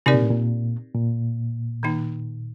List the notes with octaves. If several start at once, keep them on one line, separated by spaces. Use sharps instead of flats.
C3 C4 D#4 G4 A#4 D5
A#2
A2
A#2
A#2
D#3 A#3 D#4